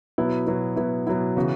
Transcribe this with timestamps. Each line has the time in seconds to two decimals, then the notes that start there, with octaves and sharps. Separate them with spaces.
0.18 B2 F#3 B3 E4
0.47 B2 F#3 B3 E4
0.76 B2 F#3 B3 E4
1.07 B2 F#3 B3 E4
1.37 C#3 E3 B3 F#4